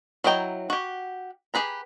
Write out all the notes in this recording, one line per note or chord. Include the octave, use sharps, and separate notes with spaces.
F#3 E4 D#5 G5 A#5
F#4 G4
G4 G#4 B4 A#5